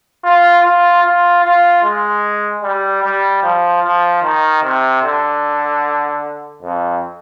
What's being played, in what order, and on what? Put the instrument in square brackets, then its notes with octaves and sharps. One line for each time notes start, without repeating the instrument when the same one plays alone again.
[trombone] F4
F4
F4
F4
G#3
G3
G3
F3
F3
D#3
C3
D3
F2